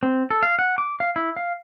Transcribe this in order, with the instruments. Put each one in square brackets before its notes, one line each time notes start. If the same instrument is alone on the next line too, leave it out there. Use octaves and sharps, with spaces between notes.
[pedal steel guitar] C4
A4
F5
F#5
D6
F5
E4
F5